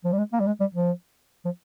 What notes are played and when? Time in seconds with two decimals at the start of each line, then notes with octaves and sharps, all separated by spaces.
0.05 F3
0.13 G3
0.18 G#3
0.33 A#3
0.40 G3
0.47 G#3
0.60 G3
0.75 F3
1.45 F3